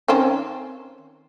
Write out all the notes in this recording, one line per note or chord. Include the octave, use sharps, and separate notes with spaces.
D#3 C4 C#4